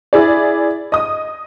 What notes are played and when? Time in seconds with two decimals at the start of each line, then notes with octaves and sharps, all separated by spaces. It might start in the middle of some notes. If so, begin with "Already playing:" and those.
0.13 E4 G#4 D5
0.92 D#5 D#6